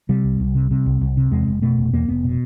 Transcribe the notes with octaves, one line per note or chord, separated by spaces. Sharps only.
C3 G3
C2
C2
C3
C3
C2
C2
C3
E2 G#3
F1
B2 A3
F1
E2 A#3
F1 B3
B2